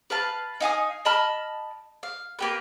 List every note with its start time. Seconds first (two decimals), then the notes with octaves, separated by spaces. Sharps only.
0.10 B4 F5 A5
0.61 D#4 F5 G#5 D#6
1.05 D#5 A5 B5 F6
2.03 F5
2.39 A#3 G4 B4